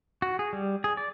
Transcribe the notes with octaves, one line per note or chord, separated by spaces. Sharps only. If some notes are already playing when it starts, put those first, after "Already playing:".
F#4
G#4
G3
G#4
D5